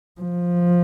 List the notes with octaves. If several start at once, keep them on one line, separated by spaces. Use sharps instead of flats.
F3